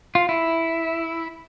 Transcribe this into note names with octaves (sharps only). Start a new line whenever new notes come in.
F4
E4